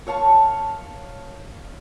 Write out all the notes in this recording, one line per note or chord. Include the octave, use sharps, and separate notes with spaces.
C#5 F5 A5 C#6